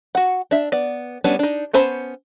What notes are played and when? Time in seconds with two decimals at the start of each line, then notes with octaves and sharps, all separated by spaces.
0.15 F#4 F#5
0.51 D4 E5
0.72 B3 D5
1.24 G3 B3 C#4 D4 A5
1.39 D4 D#4
1.73 B3 C#4 C5 A5 B5